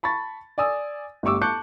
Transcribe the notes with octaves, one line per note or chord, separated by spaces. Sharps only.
A5 B5 C#6 A6
D5 G#5 D#6 E6
G1 A3 G4 C#6 D6 E6
A5 C#6 D6 F#6 G6 C#7